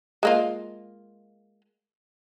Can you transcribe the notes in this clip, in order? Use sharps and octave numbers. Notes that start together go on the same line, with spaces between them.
G#3 A#3 F4